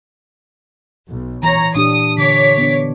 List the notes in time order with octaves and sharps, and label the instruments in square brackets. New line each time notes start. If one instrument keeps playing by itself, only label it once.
[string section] B1
[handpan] E3 [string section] C#5 A#5
[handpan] A#2 D4 G4 [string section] D#6
[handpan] D3 [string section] C#5 D6 B6
[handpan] B3 D4